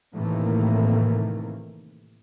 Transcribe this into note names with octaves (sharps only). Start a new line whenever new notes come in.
A2 C3 D#3 E3 A3 A#3